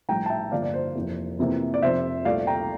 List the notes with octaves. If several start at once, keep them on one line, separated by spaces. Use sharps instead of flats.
A#1 A2 G3 G5 A#5
A5
E5 G5
G1 G2 F3 A#3 D5 F5
D5
C5
F1 F2 E3 A#3
F2 C3 E3 A#3
D5
F1 F2 C3 C5 E5
C2 A#2 A3 D5 F5
G5 A#5